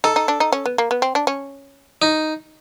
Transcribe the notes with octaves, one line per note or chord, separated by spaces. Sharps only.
D#4 A4
D#4
D4
D#4
C#4
B3
A#3
B3
C4
D4
C#4
D#4